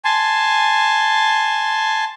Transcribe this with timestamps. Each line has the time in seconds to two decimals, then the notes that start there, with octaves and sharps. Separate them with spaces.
0.05 G#5 A5 C6